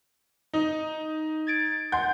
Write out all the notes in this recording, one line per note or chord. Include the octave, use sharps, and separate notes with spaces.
D#4
G#6 A6 D7
F#5 G#5 C6 G6